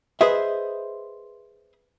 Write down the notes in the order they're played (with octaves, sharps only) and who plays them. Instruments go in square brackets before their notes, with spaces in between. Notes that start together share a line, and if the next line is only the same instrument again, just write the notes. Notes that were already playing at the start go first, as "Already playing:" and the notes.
[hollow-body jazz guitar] G#4 B4 C5 D#5 E5